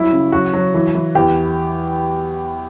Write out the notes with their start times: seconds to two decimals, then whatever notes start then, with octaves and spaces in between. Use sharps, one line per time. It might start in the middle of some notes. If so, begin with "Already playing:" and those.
Already playing: F#3 G3 E4
0.12 C#3
0.32 F#3 F#4
0.53 F#3
0.74 E3
0.95 E3
1.15 E2 G4